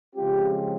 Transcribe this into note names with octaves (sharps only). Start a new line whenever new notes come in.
C#3 F3 G#3 C4 F4 G4